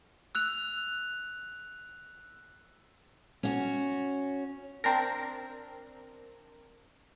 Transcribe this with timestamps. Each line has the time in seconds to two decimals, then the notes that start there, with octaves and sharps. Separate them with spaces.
0.35 E6 F#6 F7
3.43 C#4 F#4
4.84 C4 D4 A#4